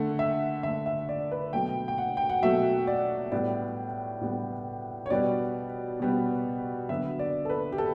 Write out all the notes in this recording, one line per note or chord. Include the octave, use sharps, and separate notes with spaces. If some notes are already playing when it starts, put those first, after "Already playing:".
Already playing: D3 A3 F#5
E5
D3 A3 E5
E5
D5
B4
B2 F#3 A3 G5
G5
F#5
G5
F#5
B2 F#3 A3 E5
D5
A2 G3 B3 D5
A2 G3 B3
C#5
B2 G3 B3 D5
B2 G3 B3
D3 F#3 B3 E5
D5
A4
B4
G4
A4